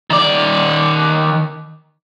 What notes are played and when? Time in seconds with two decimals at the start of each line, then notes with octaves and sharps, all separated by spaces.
0.10 D#3 D5